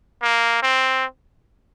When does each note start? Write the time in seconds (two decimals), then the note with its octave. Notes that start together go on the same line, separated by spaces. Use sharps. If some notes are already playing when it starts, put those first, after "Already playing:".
0.22 A#3
0.63 C4